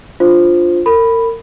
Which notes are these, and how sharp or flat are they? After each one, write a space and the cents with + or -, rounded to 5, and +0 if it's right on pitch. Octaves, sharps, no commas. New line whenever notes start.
D4 +0 F4 +0 C5 +0
A#4 -35 B5 +0